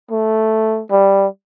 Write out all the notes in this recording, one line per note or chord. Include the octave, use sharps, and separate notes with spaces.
A3
G3